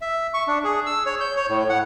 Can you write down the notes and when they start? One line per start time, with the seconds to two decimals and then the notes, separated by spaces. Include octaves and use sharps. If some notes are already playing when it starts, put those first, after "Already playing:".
0.01 E5
0.34 C#6
0.48 D4
0.64 G#4
0.86 E6
1.06 C#5
1.21 G6
1.36 C#5
1.49 A2
1.69 F#5